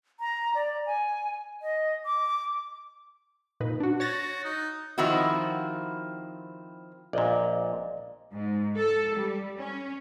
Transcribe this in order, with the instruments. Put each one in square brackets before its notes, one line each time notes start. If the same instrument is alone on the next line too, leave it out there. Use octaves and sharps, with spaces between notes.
[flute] A#5
D5
G#5
D#5
D6
[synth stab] A#2 D#4 B4
D4 F#4
[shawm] F#4 [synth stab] C#5 A6 A#6
[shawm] D#4
[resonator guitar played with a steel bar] D#3 F3 C4 E4 F#4
[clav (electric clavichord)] A#1 A#2 [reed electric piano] D5 D#5
[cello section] G#2
A4
G3
C#4